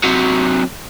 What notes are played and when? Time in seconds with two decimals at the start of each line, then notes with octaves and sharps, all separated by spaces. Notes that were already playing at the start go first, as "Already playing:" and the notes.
0.04 C3 F#3